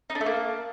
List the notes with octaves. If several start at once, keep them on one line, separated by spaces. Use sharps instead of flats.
D#4
D4
A3
A#3